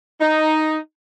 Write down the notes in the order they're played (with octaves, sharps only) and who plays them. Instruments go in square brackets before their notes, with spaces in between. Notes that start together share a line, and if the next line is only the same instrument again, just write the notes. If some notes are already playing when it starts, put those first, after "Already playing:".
[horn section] D#4